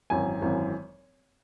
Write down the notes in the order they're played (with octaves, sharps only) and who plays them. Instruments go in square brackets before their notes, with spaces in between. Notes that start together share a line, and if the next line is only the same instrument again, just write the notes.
[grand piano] G#1 F#2 E3 G#5
G#1 F#2 E3